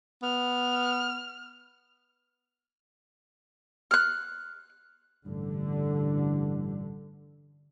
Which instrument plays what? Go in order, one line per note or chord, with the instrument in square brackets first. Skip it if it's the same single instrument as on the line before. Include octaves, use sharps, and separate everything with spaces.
[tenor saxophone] B3 [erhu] F6
[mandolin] F6 F#6
[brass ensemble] A1 G2 [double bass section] D3